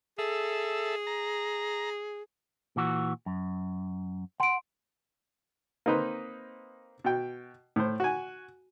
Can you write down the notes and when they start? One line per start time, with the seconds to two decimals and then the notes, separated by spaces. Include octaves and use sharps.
0.19 G#4 A4 E5
1.07 A#5
2.76 A#2 E3 F#4
3.26 F#2
4.40 F#5 C6 D7
5.86 A#3 C4 D#4 B4 C5
7.04 B2 G5
7.76 A2 C5
8.00 F#4 G#5